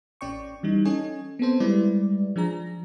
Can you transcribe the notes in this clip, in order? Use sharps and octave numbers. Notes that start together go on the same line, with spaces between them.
A1 C#4 D5 G5 C#6
E3 G3 D#4
C#4 A4 C#5 D#5 G#5
B3 C4 A4 C5
G3 G#3 E4 B4 D5
F3 D4 G#4 A#5 A#6